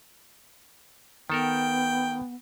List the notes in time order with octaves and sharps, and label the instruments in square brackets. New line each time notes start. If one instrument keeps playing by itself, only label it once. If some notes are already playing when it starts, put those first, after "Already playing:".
[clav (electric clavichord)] D#3 A4 A#4 [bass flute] B3 [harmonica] G5